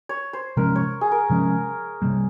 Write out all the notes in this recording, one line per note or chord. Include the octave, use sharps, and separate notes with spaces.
C#5
C5
C3 F3 G#3 C#4 A#4
C#5
G#4
A#4
C3 F3 G#3 C#4
C3 G3 A#3